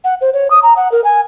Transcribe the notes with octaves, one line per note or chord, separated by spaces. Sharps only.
F#5
C5
C#5
D#6
A#5
F#5
A#4
G#5